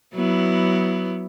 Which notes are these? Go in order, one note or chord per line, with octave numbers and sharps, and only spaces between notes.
F#3 B3 E4